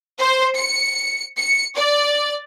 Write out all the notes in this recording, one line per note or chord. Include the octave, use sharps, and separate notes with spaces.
C5
C#7
C#7
D5